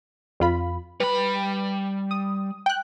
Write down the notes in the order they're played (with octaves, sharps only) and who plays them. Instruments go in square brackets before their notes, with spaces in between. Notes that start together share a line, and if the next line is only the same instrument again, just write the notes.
[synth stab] F2 F4 B5
[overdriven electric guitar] G3 B5 [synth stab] B4
[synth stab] D#6
G5 F#6